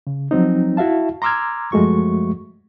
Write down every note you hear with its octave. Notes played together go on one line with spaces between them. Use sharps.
C#3
F3 F#3 C4 D#4
E4 F#4 E5 F5 A5
A#5 C6 D6 E6 F6 G#6
F#2 F3 G#3 A3 F#4 C#6